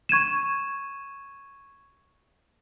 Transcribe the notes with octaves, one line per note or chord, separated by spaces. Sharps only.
C#6 G#6 D#7 E7